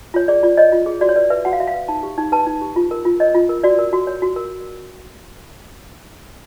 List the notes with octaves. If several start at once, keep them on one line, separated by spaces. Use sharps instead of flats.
F4 C#5
G#4 D5
F4 D5
C#5 D#5
F4
G#4
F#4 D5
C#5
B4 D5
B4 E5
F#4 F#5
F5
F#4 E5
F5
B4
D#4 A5
G4
D#4
B4 A5
D#4
G4
F4
A#4
F4
C#5 D#5
F4
A#4
F#4 D5
A#4
F#4
C#5
F#4
A#4